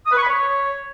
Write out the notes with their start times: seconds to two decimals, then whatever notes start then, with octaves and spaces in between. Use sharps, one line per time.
0.06 D#6
0.12 B4
0.18 C#6
0.23 B5
0.29 C#5